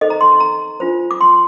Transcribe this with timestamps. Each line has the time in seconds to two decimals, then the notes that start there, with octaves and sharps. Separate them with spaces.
0.01 D#4 A4 C5 D#5
0.10 A#5
0.21 C6
0.40 A#5
0.80 D4 F4 C5
1.11 D6
1.21 C6